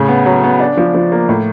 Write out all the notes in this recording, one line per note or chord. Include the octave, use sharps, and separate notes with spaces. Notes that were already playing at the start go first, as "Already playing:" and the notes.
Already playing: A2 C#3
B3
F#3
B3
D4
F3
F3
A#3
A2